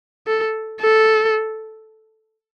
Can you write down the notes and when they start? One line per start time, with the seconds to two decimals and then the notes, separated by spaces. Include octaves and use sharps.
0.27 A4
0.80 A4